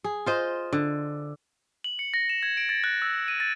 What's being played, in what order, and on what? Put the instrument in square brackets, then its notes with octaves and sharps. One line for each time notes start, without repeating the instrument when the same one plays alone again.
[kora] G#4
F4 C5 D#5
D3
[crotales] F#7
C#7
A#6
E7
G#6
D7
A6
F#6
E6
D#7
A6